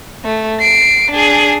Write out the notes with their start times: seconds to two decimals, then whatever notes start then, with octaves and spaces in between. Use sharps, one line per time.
0.25 A3
0.60 C7 D7
1.12 D4 G#4